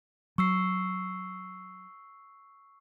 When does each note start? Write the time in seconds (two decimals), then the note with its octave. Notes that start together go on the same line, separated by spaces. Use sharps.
0.38 F#3 C#6 E6 C7